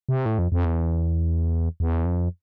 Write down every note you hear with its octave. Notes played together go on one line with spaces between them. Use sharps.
C3
A2
F2
F2
E2
E2
F2